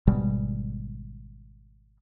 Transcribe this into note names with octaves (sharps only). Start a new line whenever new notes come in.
G#1 B2 G3 G#3